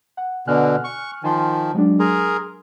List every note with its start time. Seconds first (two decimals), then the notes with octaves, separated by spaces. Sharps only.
0.17 F#5
0.47 B2 D3 G#5 F6 F#6
0.84 C#6
1.23 D#3 F3 G#5 A5 C6
1.74 F#3 G#3 D4
2.00 G#4 A#4 C6